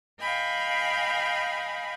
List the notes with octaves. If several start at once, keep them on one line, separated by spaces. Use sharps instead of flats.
D#5 F5 G5 G#5 B5